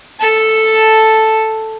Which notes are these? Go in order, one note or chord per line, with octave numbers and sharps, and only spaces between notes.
A4 A5